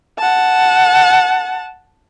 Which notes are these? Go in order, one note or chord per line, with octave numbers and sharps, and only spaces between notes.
F#5 A5